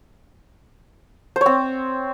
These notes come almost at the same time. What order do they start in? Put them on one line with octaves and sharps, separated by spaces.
C5 C#5 C4